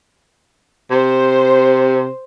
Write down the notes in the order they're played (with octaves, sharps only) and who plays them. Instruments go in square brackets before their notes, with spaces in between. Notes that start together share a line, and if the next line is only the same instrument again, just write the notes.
[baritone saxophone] C3 [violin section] C5